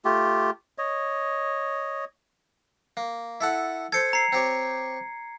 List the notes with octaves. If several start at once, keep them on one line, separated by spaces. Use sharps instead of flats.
A3 F4 G4
C#5 D#5
A#3
E4 A4 F#5
A4 C5 C6 G#6 C#7
A#5 C7
C4 G4 C#5